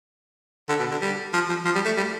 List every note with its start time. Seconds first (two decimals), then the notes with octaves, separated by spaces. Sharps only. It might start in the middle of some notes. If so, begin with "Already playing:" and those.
0.69 D3
0.79 B2
0.91 D3
1.02 G3
1.33 F3
1.49 F3
1.65 F3
1.75 G3
1.85 A3
1.97 G3